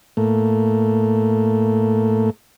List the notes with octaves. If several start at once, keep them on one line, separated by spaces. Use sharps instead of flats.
A2 A3 A#3